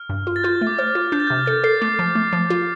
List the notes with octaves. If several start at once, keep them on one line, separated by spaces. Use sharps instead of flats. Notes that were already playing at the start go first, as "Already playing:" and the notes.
Already playing: F6
G2
F4
A6
F4 G6
A3
D6
C5 F6
F4
D4 G6
A6
C3 G6
A4 A6
A4 C7
A3 D6
F3
A3
F3
F4